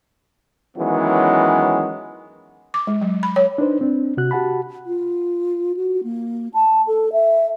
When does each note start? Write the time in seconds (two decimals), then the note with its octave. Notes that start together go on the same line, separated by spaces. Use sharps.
0.77 D#3 E3 F#3 G#3 B3 C#4
2.74 D6
2.87 G#3
3.01 F#3
3.23 B5
3.36 C#5
3.58 D4 D#4 B4 C5
3.81 C4 D4
4.17 C3 F#4 F#6
4.31 F#4 G4 F#5 A5 B5
4.86 F4
5.77 F#4
6.04 A#3
6.54 A5
6.87 A4
7.13 E5